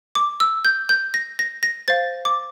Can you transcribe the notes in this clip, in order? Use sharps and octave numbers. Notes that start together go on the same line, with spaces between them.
D6
E6
G6
G6
A#6
A#6
A#6
C5 F5 A6
D6